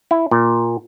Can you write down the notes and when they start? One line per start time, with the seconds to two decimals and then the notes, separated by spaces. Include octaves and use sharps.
0.11 E4
0.31 A#2